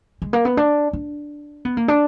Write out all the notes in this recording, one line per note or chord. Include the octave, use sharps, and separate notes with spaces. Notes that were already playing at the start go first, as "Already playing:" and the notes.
G#3
A#3
B3
D4
D4
B3
A#3
D4